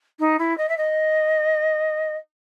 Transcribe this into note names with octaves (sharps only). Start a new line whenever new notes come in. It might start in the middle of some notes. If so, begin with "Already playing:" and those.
D#4
E4
D#5
E5
D#5